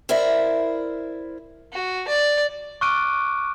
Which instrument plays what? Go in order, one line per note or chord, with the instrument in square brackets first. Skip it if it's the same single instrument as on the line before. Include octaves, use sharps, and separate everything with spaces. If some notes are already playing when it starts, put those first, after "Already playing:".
[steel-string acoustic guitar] E4 A#4 C5 D5 E5
[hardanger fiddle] F#4
D5
[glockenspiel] C#6 D6 F6 F#6 D7 D#7